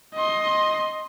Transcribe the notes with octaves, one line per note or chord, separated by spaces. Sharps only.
D#5 C6